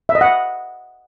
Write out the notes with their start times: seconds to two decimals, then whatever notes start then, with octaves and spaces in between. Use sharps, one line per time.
0.09 E5
0.15 D#5
0.21 F#5